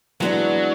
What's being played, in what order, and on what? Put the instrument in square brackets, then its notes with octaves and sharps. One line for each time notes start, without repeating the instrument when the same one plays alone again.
[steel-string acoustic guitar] E3 G#3 B3 D4 F#4 [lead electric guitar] F#3